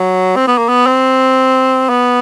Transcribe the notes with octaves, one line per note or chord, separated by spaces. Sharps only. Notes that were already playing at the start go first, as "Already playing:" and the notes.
Already playing: F#3
C4
B3
A#3
B3
C4
B3